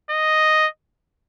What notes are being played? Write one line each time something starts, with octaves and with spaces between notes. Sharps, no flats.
D#5